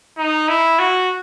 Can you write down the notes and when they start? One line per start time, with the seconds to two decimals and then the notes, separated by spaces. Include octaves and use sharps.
0.18 D#4
0.48 E4
0.79 F#4